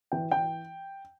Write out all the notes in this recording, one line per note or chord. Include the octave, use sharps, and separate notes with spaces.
E3 G5
E3 G5